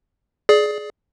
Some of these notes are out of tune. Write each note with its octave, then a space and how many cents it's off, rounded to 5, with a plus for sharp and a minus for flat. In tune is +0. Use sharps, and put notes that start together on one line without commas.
G#4 +20 D5 +0